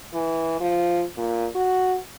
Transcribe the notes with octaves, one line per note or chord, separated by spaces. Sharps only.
E3
F3
A#2
F#4